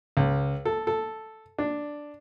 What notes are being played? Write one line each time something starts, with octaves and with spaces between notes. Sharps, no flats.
C#2
A4
A4
D4